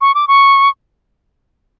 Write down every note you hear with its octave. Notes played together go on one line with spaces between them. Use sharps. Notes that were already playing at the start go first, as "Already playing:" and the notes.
C#6
D6
C#6